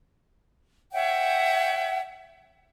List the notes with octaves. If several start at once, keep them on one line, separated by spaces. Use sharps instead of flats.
C#5 E5 F#5 G5